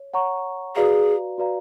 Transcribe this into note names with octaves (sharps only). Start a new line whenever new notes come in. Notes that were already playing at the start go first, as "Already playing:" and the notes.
Already playing: C#5
C#5 F#5 A#5 C#6
F#4 G#4 B4 D5 F5 A#5
F#4 B4 D5 F5 A#5